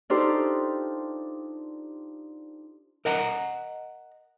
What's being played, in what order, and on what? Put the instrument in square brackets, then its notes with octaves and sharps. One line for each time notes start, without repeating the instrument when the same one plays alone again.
[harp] D4 D#4 F4 G4 A4 C5
[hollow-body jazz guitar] A#4 D#5 F#5 A#5